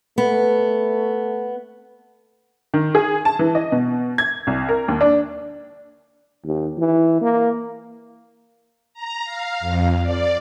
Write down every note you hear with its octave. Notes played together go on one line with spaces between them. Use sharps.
A3 B3
D#3
G#4
A5
E3
D#5
B2
G#6
C2
A#4
D#2
D4
D#2
E3
A#3
A#5
F5
F2
D5